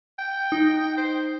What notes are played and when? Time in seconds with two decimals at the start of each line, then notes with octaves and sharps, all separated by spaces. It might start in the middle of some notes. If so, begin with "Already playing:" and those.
0.18 G5
0.52 D#4
0.97 C5